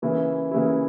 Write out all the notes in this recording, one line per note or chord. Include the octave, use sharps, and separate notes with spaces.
C#3 E3 A#3 E4
C#3 E3 A#3 E4